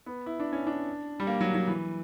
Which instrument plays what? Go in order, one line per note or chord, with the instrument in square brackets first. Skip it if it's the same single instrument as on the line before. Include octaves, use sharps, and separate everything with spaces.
[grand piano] B3
E4
D4
C#4
D4
G3
A#3
F#3
F#3
E3